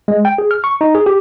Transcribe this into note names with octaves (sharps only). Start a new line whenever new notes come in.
G#3
G5
G#4
F6
C#6
D#4
G#4
G4